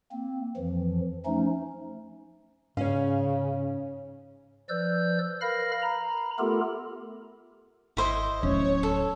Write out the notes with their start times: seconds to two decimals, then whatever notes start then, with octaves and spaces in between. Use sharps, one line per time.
0.12 A#3 C4
0.57 F2 E3 F3
1.26 F3 A3 C#4 D#4
2.77 G#2 C#3 C#4 C#5 F5
4.69 F3 B4 D5 E6 G6
5.41 A#4 B4 F5 B5 F6 A#6
5.82 A#5 B5
6.39 A3 B3 F4 G4 A4 A#4
7.97 G#1 E4 C5 D#5
8.43 D1 C#4 C#5
8.83 A4